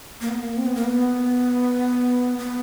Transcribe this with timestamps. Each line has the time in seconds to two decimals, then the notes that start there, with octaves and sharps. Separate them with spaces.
0.21 A#3
0.29 B3
0.38 A#3
0.57 C4
0.66 B3
0.75 A#3
0.84 B3
2.38 B3